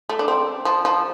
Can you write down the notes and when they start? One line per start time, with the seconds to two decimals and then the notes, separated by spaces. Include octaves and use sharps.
0.09 A3
0.19 D4
0.28 C4
0.65 F3
0.85 F3